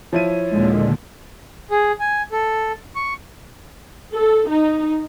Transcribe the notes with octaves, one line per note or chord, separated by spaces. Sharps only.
F3 E4 C#5 D#7
D#2 A#2 D3 G#3
G#4
G#5
A4
C#6
A4
D#4